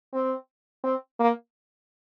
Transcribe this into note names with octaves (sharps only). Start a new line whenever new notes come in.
C4
C4
A#3